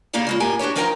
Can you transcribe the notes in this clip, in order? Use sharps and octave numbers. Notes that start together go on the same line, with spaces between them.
C#3 A#3 D#4 G4 G#4 D5
C#3 G#3 F4
A2 A#3 G4 G#5
D4 F#4 G4 C#5
F3 D#4 A#4 G5 G#5 A#5